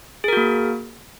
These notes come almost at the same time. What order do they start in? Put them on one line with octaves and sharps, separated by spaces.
G#4 A#4 F#4 A#3